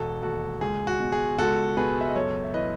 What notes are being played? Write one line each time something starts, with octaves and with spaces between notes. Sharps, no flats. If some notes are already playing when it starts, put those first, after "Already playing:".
Already playing: E1 F#4 A4
D#2 F#4 A4
C#2 G#4
F#4
B2
G#4
C#2 F#4 A4
B2 G#4 B4
E5
D#5
F#2 A4 C#5
E5
E3 B4 D#5